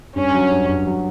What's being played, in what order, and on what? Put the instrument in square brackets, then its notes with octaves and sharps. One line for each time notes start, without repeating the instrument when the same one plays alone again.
[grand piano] G2 [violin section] C#4
[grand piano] F#3
G2
G2
F#3